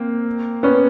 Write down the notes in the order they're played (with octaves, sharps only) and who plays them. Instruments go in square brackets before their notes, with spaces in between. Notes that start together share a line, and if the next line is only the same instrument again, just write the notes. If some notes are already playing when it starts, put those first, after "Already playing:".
Already playing: [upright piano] A#3 C4
B3 C#4